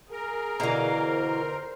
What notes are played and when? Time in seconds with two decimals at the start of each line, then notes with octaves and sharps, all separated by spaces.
0.11 G#4 A#4
0.60 B2 D3 E3 F5 A#5
1.05 C5